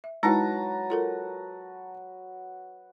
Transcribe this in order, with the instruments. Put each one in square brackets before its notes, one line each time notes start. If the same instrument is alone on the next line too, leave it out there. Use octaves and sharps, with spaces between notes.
[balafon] E5
[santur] F#3 F#4 B4 [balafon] G#3 D#4 E4 [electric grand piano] A5 A#5
[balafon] F4 A4 A#4